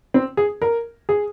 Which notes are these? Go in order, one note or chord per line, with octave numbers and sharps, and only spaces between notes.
C4
G#4
A#4
G#4